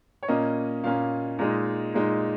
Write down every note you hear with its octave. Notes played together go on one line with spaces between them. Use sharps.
C#5
A#2 A#3 C#4 D#5
A#2 A#3 C#4 F5
A#2 G#3 D#4
A#2 G#3 D#4